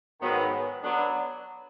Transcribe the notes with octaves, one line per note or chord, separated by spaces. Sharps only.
G#2 D#3 F#3 B3
F#3 B3 D4